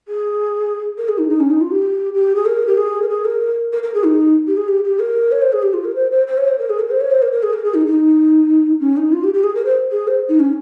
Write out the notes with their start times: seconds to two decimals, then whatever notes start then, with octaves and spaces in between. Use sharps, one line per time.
0.08 G#4
0.98 A#4
1.08 G#4
1.18 D#4
1.29 D#4
1.40 C#4
1.51 D#4
1.61 F4
1.71 G4
2.14 G4
2.35 G#4
2.46 A#4
2.67 G4
2.78 G#4
3.02 A#4
3.09 G#4
3.25 A#4
3.73 A#4
3.83 A#4
3.94 G#4
4.04 D#4
4.47 G4
4.57 G#4
4.68 G4
4.84 G4
4.99 A#4
5.32 C#5
5.42 C5
5.52 G#4
5.63 G4
5.74 F4
5.84 A#4
5.95 C5
6.11 C5
6.27 C5
6.37 C#5
6.48 C5
6.58 A#4
6.70 G#4
6.79 A#4
6.91 C5
7.01 C#5
7.11 C5
7.22 A#4
7.32 A#4
7.43 G#4
7.53 A#4
7.64 G#4
7.74 D#4
7.86 D#4
8.80 C#4
8.97 D#4
9.12 F4
9.24 G4
9.34 G4
9.44 G#4
9.55 A#4
9.65 C5
9.92 G#4
10.08 C5
10.29 D#4
10.40 C#4